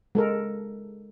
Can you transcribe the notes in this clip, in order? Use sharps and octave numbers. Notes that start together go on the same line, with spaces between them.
G#3 A4 A#4